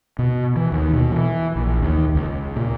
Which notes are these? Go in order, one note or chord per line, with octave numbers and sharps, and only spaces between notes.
B2
E3
D#2
B2
E3
A#1
D#2
C#2
A#2